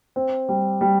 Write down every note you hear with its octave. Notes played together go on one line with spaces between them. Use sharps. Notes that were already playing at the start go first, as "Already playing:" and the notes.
C4
G3
G3